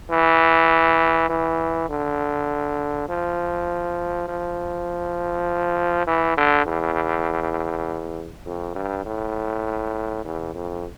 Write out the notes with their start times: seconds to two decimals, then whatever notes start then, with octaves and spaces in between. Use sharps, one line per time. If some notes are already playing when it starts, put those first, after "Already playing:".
0.10 E3
1.29 E3
1.89 D3
3.09 F3
4.28 F3
6.07 E3
6.37 D3
6.66 E2
8.45 F2
8.75 G2
9.05 A2
10.25 E2
10.54 F2